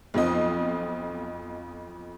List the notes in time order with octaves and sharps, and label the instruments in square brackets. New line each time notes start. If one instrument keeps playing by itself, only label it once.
[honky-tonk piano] B1 F2 F3 D#5